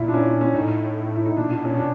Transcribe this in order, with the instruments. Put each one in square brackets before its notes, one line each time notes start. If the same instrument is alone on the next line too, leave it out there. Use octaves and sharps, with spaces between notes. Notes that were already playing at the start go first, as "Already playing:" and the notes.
Already playing: [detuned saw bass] A#2 [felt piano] E4
[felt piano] D4
C#4
C#4
[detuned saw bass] A2 [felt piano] D#4
[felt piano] E4
D#4
[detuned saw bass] A#2 [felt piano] D4
[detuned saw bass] B2 [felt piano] D4
[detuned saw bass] A#2 [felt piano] C#4
[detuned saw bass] B2
[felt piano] D4